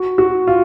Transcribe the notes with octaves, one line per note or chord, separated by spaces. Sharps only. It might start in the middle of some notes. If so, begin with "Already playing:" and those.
Already playing: F#4
F#4
F4